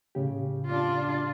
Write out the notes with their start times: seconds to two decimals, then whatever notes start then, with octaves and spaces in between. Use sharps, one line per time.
0.15 A2 C#3 G4
0.66 D4 F4